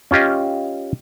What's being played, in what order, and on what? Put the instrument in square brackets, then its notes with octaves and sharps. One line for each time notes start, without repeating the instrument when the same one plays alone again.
[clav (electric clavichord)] C#4 F4 G4 D#5